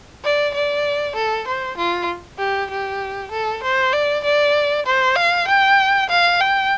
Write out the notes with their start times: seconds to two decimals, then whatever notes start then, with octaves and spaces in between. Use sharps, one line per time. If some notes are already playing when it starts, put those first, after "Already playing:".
0.24 D5
0.54 D5
1.16 A4
1.47 C5
1.77 F4
2.39 G4
2.71 G4
3.31 A4
3.63 C5
3.93 D5
4.24 D5
4.86 C5
5.16 F5
5.48 G5
6.10 F5
6.40 G5